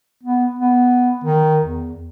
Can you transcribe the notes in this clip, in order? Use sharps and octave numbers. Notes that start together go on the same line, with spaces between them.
B3
B3
D#3
E2